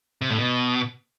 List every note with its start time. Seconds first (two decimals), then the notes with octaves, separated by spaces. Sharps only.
0.21 C3
0.30 A2
0.38 B2